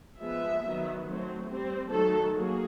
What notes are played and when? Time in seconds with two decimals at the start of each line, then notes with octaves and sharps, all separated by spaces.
0.20 F3 G#3 B3 E5
0.62 D#3 F#3 B3
1.06 F#3 A3 C4
1.48 G3 C4
1.90 D#3 F#3 A3 A4
2.33 F#3 A#3 G#4